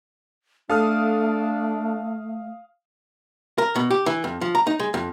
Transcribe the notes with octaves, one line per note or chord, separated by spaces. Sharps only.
A3 D4 A4 F5 D#6 F6
A#4
B2
G4
E3
F2
F3
A#5
D#4
G#3
F2